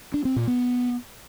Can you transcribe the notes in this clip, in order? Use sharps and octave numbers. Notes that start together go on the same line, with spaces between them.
D4
C4
A#2
B3